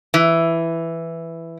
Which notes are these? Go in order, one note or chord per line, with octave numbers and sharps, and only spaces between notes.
E3